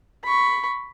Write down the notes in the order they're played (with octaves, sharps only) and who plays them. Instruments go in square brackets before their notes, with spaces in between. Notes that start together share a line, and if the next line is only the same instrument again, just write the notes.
[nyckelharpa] B5 C#6